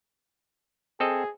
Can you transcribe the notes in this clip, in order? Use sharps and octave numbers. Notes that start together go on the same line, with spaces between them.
C4 G#4 A4 D#5